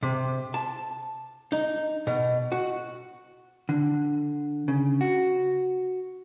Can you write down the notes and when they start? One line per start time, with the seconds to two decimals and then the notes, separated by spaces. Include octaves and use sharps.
0.03 C3
0.54 A5
1.52 D#4
2.07 B2
2.52 F#4
3.69 D3
4.68 C#3
5.01 F#4